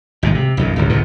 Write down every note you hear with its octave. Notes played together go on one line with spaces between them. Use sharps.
G#1 A#2 G#3
C3
B1 F#2 A#2
D1 G1 C#2
D1 C#2 F#2 B2